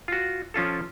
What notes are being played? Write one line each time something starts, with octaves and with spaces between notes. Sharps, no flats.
F4 F#4
F3 C#4 F4 A4